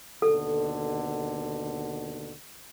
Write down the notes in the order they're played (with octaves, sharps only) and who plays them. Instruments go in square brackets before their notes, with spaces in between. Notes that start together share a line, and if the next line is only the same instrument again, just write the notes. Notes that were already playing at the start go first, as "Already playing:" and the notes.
[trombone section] D#2 B2 D3 [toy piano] A4